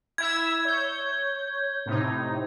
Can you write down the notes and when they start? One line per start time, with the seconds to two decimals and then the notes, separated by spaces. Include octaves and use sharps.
0.18 E4 E5 E6 G#6
0.65 C#5 G6
1.86 A2 C3 D#4